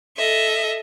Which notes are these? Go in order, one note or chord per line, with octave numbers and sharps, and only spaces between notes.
A4 D#5 E5